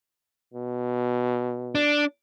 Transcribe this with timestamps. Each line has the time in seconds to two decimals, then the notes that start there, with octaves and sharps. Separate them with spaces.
0.54 B2
1.75 D4